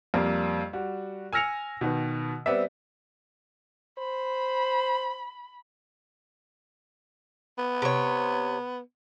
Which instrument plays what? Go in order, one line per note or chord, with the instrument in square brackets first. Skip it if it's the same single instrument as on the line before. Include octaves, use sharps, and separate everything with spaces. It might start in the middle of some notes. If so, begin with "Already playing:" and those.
[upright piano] F2 G3 A#3
G3 F#4
G#5 E6 F6 A#6 C#7 F7
B2 D#3 B3
G3 B3 C4 D5 E5
[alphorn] C5 [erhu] B5
[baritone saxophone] B3
[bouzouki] C3 C#5